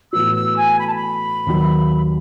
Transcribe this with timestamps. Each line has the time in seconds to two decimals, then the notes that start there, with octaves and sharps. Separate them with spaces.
0.13 A2 E3 B3 F#4 E6
0.35 E6
0.57 G#5
0.79 B5
0.88 A5
0.94 B5
1.46 D#2 D#3 F#3